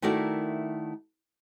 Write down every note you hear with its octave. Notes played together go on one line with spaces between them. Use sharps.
D#3 A3 E4 F#4 A#4 D5